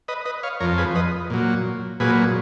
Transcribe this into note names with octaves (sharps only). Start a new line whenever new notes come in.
B4 D#5
B4 D#5
C#5 F5
F2 F3 A#4 C#5
G#4 B4
B4 D#5
A#2 F#3
A#2 F#3 G#4 B4